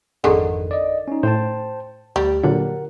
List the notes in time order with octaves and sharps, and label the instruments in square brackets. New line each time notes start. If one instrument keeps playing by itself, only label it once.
[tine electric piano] G#1 F2 [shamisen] D3 D#3 G#4
[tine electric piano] D5 D#5
C#4 D#4
[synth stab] A2 [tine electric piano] C5 G5 A5
[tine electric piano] D2 [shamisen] G3
[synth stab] A#2 D3 F#3 [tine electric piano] A#4 F#5